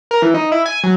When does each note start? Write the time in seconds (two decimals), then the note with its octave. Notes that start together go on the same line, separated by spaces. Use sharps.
0.11 A#4
0.22 E3
0.34 D#4
0.52 E4
0.66 G#5
0.84 F#3